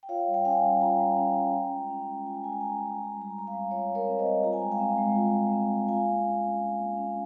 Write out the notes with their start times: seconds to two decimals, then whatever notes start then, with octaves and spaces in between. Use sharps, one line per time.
0.03 G5
0.09 F4 C#5 F5
0.27 G3
0.34 G5
0.45 C#4 F5 G#5
0.63 G3
0.81 F4 G5 A#5
0.99 G3
1.18 C#4
1.36 G3
1.54 F4
1.72 G#3
1.90 C#4
2.08 G#3
2.26 F4 G#5
2.35 A#5
2.44 G#3 G#5
2.52 A#5
2.61 C#4 G#5
2.69 A#5
2.78 G#3 G#5
2.87 A#5
2.95 F4 G#5
3.04 A#5
3.12 G#5
3.17 G3 A#5
3.30 G#5
3.35 C4 A#5
3.47 F5 G#5
3.53 G3
3.71 F4 C#5 F5
3.89 G3
3.95 A#4 C#5
4.08 C4
4.19 C5 D#5
4.26 G3
4.44 F4 A#5
4.53 G#5
4.62 G#3 G5
4.72 F5 G#5
4.80 C4
4.98 G#3
5.16 F4
5.34 G#3
5.52 C4
5.71 G#3
5.88 F4 F5 G#5
6.07 A#3
6.25 C#4
6.43 A#3
6.61 F4
6.79 A#3
6.97 C#4